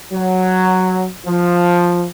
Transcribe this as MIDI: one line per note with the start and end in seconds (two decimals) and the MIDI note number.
0.12 1.08 54
1.25 2.06 53